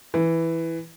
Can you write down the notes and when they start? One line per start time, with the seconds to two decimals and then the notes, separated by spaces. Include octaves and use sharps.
0.14 E3